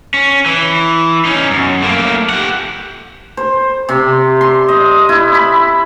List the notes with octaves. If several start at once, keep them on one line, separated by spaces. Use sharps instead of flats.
C#4
E3
C#4 D#4
F#2
A3 A#3
G4 F#5
C5
C3
C6
D#5
E4
B5